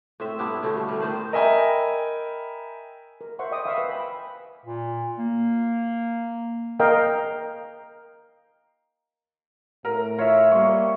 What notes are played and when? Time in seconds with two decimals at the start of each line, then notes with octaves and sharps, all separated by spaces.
0.20 A2 C4 E5
0.39 G3 B3 D4 E4
0.62 B2 D3 A3 C#4
0.77 G2
0.88 G3 A3
1.00 A2 D#3 C5 D5
1.32 A#4 D#5 E5 G5 G#5 B5
3.21 A#4
3.39 C5 E5 F#5 C6 C#6
3.51 D5 D#5 G5 B5 D6 D#6
3.65 E5 F5 B5 C#6 D#6 E6
3.78 B4
3.90 G5 G#5 B5
4.65 A#2
5.19 A#3
6.80 A#4 D#5 F5 G5
9.85 A2 A#4
10.18 F4 C#5 E5
10.52 G3 A#3 C#6